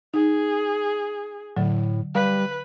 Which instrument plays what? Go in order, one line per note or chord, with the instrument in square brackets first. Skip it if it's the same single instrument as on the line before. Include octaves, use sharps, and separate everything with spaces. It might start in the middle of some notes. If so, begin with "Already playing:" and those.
[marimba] D#4 [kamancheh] G#4
[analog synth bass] A2 [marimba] D3 F#3
[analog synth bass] G3 [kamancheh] B4 [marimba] F5